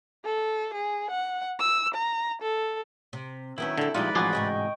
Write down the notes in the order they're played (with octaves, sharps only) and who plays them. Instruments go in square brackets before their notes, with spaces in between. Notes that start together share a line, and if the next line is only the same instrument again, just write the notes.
[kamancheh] A4
G#4
F#5
E6
A#5
A4
[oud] C3
[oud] D#3 B3 C#4 [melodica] F#3 G5 [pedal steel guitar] E4
[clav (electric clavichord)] D3 [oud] D4 A4
[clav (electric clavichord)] A#1 G3 F4 [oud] G#3 D#4 [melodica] B4 D5 B5
[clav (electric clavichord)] A1 F#4 G#4 [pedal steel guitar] F3 F4 D6
[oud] D2 G#2 C3 [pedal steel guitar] D#5 G5 C#6